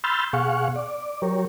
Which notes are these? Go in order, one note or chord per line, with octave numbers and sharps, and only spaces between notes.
B5 C6 E6 F6 G6 A6
B2 G#4 F5 F#5 C#6
D5
F#3 G4 A#4 C#5